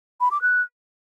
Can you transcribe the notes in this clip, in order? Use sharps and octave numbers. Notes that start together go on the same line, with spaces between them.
B5
D6
F#6